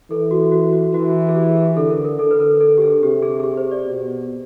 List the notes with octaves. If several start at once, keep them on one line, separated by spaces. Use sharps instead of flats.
E3 A4
F#4
F#4
F#4
E3 F#4
G#4
G4
G#4
D3 A4
A#4
A#4
D3 A4
B4
A#4
A4
G4
G#4
C3 G4
G#4
G#4
G4
C5
D5
B2